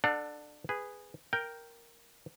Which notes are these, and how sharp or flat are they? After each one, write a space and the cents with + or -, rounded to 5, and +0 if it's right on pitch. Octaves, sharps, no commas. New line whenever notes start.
D4 +20 A4 +0 F#5 -35
G#4 -10 B4 +5
A#4 +0 G5 +0